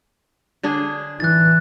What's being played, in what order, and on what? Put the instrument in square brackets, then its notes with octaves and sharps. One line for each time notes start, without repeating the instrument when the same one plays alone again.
[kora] D3 D4 G#4
[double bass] E3 [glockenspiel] F#6 A6